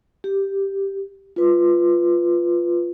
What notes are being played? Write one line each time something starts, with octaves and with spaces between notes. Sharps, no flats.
G4
F4 B4